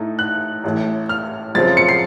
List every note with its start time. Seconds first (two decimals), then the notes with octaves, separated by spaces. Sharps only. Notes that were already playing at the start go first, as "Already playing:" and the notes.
Already playing: A2 A3 D#4
0.19 F#6
0.64 A1 A2 A3
1.09 F6
1.55 F#2 C#3 F3 C4 A6
1.77 C#7
1.89 C7